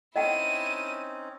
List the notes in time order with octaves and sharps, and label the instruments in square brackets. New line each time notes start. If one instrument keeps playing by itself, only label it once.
[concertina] C4 C#4 D#4 [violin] E4 D#7 [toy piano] D#5 F#5 G5